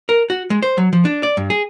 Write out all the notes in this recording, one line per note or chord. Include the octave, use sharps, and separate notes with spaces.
A#4
F#4
G#3
C5
F#3
F3
D4
D5
G2
G#4